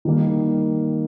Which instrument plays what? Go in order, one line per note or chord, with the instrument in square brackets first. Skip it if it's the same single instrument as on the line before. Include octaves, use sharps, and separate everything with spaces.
[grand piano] D#3 G3 A#3